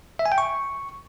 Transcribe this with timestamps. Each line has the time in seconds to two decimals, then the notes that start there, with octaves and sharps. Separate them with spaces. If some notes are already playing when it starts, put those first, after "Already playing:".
0.19 E5
0.26 G#5
0.32 G5
0.38 C#6